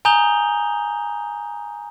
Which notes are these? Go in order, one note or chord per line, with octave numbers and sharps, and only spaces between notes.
G#5 A#5 D#6 G6 F7 G7